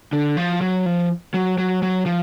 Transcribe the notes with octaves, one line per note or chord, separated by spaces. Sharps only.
D3
F3
F#3
F3
F#3
F#3
F#3
F3